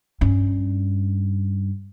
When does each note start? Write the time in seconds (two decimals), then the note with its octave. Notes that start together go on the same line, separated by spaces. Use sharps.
0.21 G2 C#4